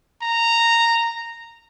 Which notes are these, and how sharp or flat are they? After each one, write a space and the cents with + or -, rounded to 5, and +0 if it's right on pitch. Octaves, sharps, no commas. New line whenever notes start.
A#5 -10